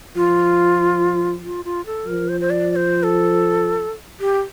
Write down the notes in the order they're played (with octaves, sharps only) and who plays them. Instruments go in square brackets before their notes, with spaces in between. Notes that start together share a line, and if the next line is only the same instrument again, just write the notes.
[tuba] F3 [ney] F4
[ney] F4
F4
A4
[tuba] F3 [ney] A#4
[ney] C5
C5
D5
D5
C5
A4
G4